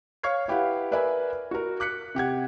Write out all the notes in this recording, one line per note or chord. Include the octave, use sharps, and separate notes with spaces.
C#5 F5 C#6 F6 G#6 C7
E4 G4 B4 F5 F#5
A#4 B4 D5 E5 G#5 B5
F#4 A#4
D6 F#6 B6 C#7
C3 G4 F#5 G#6